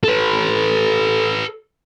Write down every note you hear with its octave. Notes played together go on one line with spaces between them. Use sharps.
A4 B4